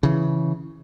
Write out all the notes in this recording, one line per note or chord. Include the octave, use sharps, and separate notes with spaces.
C#3 E3